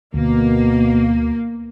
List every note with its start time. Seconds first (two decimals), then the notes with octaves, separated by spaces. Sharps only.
0.14 D2 B2 A#3